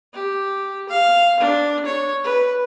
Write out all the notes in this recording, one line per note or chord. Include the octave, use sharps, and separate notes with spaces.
G4
F5
D4
C#5
B4